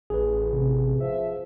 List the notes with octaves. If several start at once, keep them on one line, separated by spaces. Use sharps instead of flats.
A1 G#4 B4
C3
F3 E5